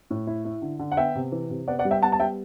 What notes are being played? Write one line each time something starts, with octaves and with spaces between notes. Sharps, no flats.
A2
E4
E4
D3
D3
F#5
B3 E5 G5
C3
E3
C3
B3 D5 F#5
D5 F#5
G3
E5 G5
B3 F#5 A5
A5
G3 E5 G5